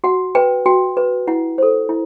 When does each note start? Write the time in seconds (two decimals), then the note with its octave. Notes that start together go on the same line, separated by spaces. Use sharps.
0.04 F#4 F#5
0.35 B4 G5
0.66 F#4 G5
0.97 B4
1.28 E4 F#5
1.58 A4 C5
1.89 E4